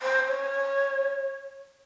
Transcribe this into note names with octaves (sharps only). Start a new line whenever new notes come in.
C5
C#5